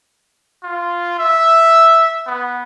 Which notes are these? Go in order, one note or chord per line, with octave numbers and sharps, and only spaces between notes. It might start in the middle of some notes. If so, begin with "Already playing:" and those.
F4
E5
B3